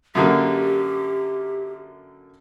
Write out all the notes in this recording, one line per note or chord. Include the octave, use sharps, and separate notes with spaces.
F#2 D3 A#3 G4